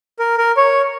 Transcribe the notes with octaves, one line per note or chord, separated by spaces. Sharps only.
A#4
A#4
C#5